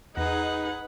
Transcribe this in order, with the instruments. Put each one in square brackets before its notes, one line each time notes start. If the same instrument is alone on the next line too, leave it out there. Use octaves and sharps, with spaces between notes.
[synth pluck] E2 A#6 E7 [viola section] D#4 G#4 [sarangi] B4 [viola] F#5